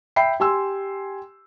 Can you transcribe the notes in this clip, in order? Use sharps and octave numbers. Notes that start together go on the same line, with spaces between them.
E5 G5 B5 C7
G4 G#5 C6 E6